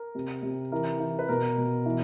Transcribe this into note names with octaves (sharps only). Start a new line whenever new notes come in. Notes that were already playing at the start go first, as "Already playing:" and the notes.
Already playing: A#4
C3
C3
E3 A#4
E3
B4
B2 A#4
B2
E3